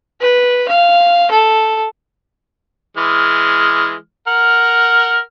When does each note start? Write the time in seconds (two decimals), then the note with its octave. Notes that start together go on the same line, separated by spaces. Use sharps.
0.21 B4
0.69 F5
1.31 A4
2.97 E3 G#3 F6
4.27 A#4 F#5 F6